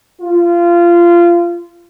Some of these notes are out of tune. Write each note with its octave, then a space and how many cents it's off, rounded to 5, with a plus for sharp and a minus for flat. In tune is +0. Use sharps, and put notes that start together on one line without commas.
F4 -20